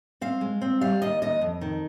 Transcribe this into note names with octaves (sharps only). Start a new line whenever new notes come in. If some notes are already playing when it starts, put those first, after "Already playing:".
C4 F5
G#3
C4
G3 F5
D#2 D#5
D#2 D#5
F2
D#3